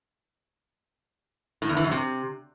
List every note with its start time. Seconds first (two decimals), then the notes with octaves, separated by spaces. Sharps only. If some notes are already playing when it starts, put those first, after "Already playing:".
1.62 A2
1.69 E2
1.77 E3
1.84 F#2
1.91 C3